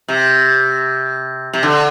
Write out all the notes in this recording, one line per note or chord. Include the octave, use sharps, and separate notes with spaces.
C3
C3
D3